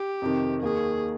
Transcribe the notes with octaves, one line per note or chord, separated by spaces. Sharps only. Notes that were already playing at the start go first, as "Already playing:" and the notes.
Already playing: G4
F2 C3 D#3
D#2 D#3 A#3 G#4